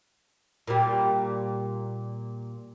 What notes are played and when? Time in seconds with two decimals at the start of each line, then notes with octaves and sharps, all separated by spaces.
0.67 A#2 G3